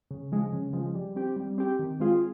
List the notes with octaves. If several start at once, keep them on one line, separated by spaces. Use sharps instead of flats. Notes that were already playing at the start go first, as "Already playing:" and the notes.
C#3
F3 G#3
C#3
F3 G#3
G3
C4 G4
G3
C4 G4
D#3
G#3 C4 F4 G#4